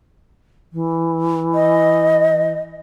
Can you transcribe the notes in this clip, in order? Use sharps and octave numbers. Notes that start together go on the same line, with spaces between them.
E3
D#5